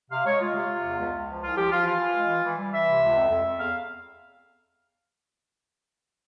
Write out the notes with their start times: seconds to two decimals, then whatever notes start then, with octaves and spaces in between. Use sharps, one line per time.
0.11 C3 F5
0.25 G#3 C#5
0.40 G#3 F4
0.55 C3
0.69 C3
0.83 E2
0.98 C#2
1.13 C#2
1.27 F3
1.41 C2 F4
1.56 F3 G4
1.70 F3 F4
1.85 E3 F4
1.99 E3
2.14 G#3
2.28 E3
2.44 E3
2.58 G3
2.73 E3 E5
2.86 C3
3.02 C#2
3.15 F2
3.30 F2
3.45 F2
3.59 E2 F5